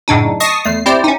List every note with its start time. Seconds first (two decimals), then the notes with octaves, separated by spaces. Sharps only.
0.08 F#2 A2 C#3 D4 D#4
0.40 D#5 A5 C#6 D#6 A#6 C7
0.65 E2 A3 C7
0.86 C4 E4 G4 C5 D5
1.04 C#4 D#4